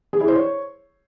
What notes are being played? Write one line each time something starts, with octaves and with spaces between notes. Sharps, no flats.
G#4
E4
C5
C#5